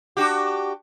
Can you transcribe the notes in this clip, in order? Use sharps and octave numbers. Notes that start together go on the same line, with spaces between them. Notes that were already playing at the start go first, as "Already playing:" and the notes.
D4 F#4 G4